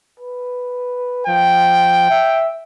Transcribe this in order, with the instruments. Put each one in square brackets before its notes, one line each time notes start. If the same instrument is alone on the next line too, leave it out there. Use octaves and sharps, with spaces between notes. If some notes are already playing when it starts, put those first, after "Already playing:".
[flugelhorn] B4
[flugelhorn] F3 [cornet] G5
[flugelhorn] E5